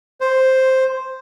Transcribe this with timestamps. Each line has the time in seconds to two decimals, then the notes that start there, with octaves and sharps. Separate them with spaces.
0.21 C5